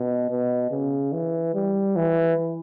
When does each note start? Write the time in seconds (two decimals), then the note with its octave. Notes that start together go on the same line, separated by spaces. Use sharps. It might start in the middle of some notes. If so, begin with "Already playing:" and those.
Already playing: B2
0.30 B2
0.71 C#3
1.13 E3
1.54 G3
1.96 E3